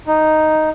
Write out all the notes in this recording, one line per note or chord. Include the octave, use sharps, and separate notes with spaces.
D#4